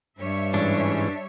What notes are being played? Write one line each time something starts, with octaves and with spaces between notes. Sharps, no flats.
G2 G3 C#5 E5
G#2 E3 C#4 D4